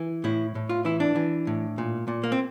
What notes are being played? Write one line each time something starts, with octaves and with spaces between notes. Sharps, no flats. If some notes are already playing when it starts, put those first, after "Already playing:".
Already playing: E3
A2 E4
A2
F4
E3 E4
D4
E3
A2
A#2
A#2
A#3
C4